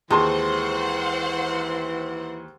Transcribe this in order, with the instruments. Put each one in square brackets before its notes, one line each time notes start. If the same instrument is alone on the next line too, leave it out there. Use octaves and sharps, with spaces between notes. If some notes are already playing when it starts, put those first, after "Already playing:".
[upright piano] D#2 A5 C6 [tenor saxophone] E3 [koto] G#3 [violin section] C5 F#5